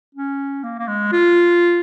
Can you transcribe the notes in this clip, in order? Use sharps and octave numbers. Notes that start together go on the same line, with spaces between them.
C#4
A#3
A#3
G#3
F4